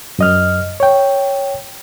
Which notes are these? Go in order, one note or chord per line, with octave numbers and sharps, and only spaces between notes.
F#2 D#5 F6
C#5 G5